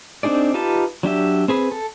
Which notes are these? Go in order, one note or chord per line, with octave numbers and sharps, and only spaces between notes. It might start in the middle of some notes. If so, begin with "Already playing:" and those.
C4 D4 D#4 G#4 D5
D#4 F4 G4 B4 A5
F#3 D4 G4 E5
C4 G#4 B4
A4